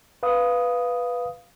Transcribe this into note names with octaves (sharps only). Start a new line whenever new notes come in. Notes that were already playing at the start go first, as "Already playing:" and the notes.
B4 F5 D#6